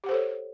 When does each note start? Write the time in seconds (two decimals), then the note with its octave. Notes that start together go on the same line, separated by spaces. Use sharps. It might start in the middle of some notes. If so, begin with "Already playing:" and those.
0.04 G4
0.06 F#5
0.09 C5
0.11 A4
0.14 C#5